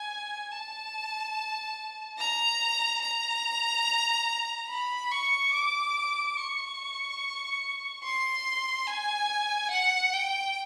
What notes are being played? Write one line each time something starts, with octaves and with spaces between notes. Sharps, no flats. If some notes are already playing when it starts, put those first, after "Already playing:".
Already playing: G#5
A5
A#5
A#5
B5
C#6
D6
C#6
C6
G#5
F#5
G5